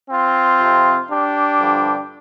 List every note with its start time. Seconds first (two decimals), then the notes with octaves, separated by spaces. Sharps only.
0.09 C4 F4
0.59 F2 C3 F3
1.09 D4 G4
1.59 G2 D3 F3